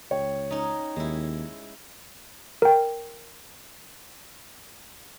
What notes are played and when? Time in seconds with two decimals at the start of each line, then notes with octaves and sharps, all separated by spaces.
0.11 C#2 C#5 G5
0.51 C#4 D#4
0.96 D#2 G#3 E4
2.62 A#4 G5